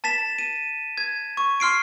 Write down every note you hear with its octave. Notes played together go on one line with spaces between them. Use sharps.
A5 A6 B6 E7
D#7
G#6
C#6
C6 F6 C7 D7